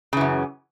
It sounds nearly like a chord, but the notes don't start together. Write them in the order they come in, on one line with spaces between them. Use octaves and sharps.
C#3 E3 F#2